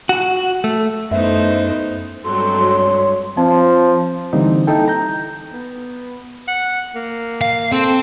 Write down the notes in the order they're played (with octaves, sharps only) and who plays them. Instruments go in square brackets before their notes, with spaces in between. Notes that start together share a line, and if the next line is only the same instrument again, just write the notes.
[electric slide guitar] F#4
A3
[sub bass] F#2 [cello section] A3 C5 [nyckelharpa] B3 D#4 [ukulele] E4 E5
[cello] G2 G#3 [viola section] F#3 C4 A4 [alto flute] C6
[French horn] C#5
[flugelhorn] F3 [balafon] C4
[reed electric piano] D3 E3 G3 A#3 C4 D#4
D#4 E4 A4 G5
A#5 G6
[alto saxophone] B3
F#5
A#3
[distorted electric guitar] F5
[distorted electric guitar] C4 [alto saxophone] A4